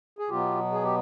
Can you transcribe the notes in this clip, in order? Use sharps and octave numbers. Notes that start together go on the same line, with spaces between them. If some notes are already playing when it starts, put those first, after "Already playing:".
G#4
B2 F#3 B3 F4 G4
G#4
G4